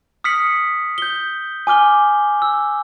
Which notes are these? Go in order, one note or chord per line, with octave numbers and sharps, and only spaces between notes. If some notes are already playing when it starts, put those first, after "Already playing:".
D#6 F6 B6 C#7 F#7
G6 G7
G#5 D6 F6 G7
E6